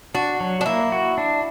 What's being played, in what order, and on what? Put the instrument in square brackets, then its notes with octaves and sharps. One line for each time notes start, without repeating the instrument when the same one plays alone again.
[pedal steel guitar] D4 [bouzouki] F#4
[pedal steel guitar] F#3
[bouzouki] D4
[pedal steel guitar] A#3 [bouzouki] E4
[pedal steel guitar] F#4
D4